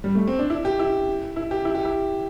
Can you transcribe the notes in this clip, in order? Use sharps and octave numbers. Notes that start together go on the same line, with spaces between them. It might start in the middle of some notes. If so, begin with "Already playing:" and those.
G3
A3
C4
D4
E4
G4
E4
E4
G4
E4
G4
E4